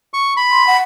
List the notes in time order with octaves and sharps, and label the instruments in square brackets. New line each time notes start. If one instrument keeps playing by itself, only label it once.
[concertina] C#6
B5
[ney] C6
F#5